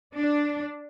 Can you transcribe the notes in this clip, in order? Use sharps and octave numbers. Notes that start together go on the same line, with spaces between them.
D4